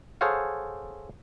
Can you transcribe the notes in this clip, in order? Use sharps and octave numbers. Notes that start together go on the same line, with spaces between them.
G#4 A4 C5 C#5 F5 F#5